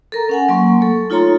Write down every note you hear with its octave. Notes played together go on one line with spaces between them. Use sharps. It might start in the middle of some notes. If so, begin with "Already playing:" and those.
A4 A#4 A#5
C#4 F#5 G#5
F#3 A#3 C6 C#6
A3 A4
D#4 F4 A4 C#5 A#5 C6